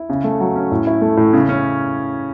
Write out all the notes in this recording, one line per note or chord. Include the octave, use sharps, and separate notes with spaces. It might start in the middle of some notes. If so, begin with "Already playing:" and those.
Already playing: E4
C#3
A3
F#3
C#4
A2
E4
A3
A2
C#3
C#4